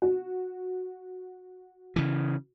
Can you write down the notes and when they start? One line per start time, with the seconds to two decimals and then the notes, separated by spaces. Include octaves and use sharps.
0.02 F#4
1.96 C#3 E3